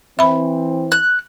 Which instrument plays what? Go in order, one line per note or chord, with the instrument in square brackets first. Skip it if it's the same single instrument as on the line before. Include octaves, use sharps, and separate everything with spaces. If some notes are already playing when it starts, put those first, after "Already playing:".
[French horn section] E3 C4 [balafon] E5 B5
[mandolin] F#6